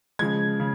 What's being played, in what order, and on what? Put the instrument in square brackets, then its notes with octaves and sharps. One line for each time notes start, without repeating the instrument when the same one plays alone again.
[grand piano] C#3 F3 G#3 G#6
C#3